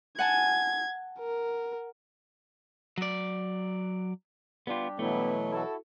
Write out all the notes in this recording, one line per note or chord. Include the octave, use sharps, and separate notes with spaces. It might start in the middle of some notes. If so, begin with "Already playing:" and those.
F#5 G#5 A5 G#6
A#4
F#3 D5
G3 B3 D4 F4 G4
B2 E3 F#3 A3 B3 E4
E4 F#4 A4